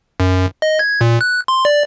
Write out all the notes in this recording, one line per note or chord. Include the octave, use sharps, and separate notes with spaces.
F#2
D#5
G#6
A#2
F#6
C6
D5